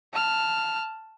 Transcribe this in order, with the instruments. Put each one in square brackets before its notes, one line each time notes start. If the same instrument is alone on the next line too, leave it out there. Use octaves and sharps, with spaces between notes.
[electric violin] A5 F6